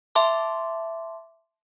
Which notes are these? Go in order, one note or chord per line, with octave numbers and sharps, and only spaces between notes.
E5 A5 C6 D6